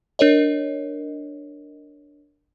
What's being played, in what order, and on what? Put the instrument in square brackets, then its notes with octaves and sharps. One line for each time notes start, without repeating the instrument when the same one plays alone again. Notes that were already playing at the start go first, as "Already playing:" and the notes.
[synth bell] D4 A#4 C#5 D#5